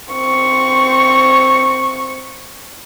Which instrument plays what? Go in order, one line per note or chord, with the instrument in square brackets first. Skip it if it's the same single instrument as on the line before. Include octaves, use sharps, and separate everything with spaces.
[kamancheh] C4 C#6